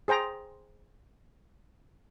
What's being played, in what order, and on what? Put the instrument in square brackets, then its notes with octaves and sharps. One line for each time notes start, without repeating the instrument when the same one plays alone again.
[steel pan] G#4 C5 G5 A#5